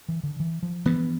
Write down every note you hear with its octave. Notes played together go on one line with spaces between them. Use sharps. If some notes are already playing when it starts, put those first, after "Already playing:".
E3
D3
E3
F3
G2 E3 B3